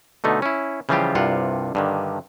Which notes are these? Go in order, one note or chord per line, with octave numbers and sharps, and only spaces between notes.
B2 D3 A3 D#4
C#4 E4
C#3 E3 F3 G3 F4 G4
C2 G2 C3 F4 F#5
G2 D3 D#3